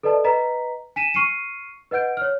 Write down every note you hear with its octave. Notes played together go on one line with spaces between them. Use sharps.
A4 B4 D5 D#5 A5
B4 D#5 A#5 B6
G#5 B6 D#7 E7
C#6 F6 C7 C#7 D#7
B4 D#5 F#5 G6 D7
C#5 F6